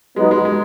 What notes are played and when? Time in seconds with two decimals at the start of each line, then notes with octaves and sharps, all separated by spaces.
0.16 F#3 G#3 B3 D#4
0.31 G#3
0.45 G#3